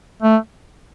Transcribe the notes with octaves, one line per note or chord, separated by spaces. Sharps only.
A3